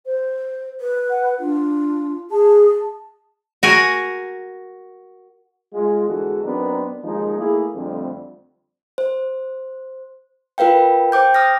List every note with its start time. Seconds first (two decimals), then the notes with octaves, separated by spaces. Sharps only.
0.05 C5
0.81 B4
1.10 F#5
1.39 D4 F4
2.31 G#4 A5
3.63 F#4 A#4 G#5
5.74 G#3 F4
6.06 E2 D3 G#3 F#4 A4
6.43 F#2 B3 C4 D4 D#4 A#4
7.03 D#2 F3 G#3 D#4
7.38 A3 A#3 E4 G#4
7.75 F2 D3 G3 A3 C4
8.98 C5
10.58 F4 A#4 B4 F5 G5
11.12 C5 G5 D6 G6
11.34 D#6 F6 A#6